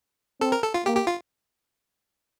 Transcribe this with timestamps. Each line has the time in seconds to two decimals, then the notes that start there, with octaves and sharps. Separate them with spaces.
0.41 C4 A4
0.52 A#4
0.63 A4
0.74 F4
0.86 A#3 G4
0.97 G4
1.07 F4